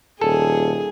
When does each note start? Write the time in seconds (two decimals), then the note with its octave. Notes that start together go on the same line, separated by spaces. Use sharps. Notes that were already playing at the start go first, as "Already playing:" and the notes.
0.21 D#1 G#4 A4